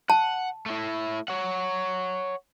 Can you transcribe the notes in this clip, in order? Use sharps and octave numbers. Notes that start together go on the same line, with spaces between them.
F#5 A5
A3 E4
C#5 F#5